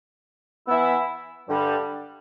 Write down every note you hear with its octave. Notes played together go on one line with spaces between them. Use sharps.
E3 B3 E4
G2 D3 G3